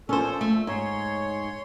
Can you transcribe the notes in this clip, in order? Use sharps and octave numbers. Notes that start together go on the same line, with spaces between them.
A#2 F3 C#4 A4 C5
A3
G#2 C#5 C6